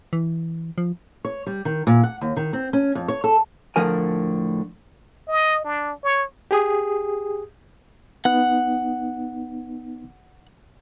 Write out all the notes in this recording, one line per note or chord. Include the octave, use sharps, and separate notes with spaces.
E3
F3
C#5
G3
D#3
A#2
F#5
D#2
D#3
C4
C#4
F2
C#5
A4
A2 D3 F3 A#4 G#5
D#5
D4
C#5
G4 G#4 D#6
B3 D#4 F#5 F#6